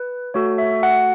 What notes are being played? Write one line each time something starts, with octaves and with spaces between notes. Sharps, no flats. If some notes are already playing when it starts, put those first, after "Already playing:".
Already playing: B4
A3 F#4 A4 C#5
E5
F#5